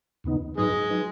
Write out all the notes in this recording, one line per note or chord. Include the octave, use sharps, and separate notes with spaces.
D#2 C#3 B3 D#4
G#2 F#3 G#3 D#4 G#4 B4
F#3 D#4 B4